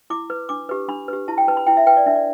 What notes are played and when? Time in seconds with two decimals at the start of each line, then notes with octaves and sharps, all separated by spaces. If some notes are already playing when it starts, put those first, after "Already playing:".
0.10 E4 D6
0.30 B4
0.49 D4 D6
0.69 G4 B4
0.88 D4 B5
1.08 G4 B4
1.28 E4 A5
1.38 G5
1.48 B4 A5
1.57 B5
1.67 E4 G5
1.77 E5
1.87 B4 G5
1.97 D5
2.06 D4 E5
2.15 D5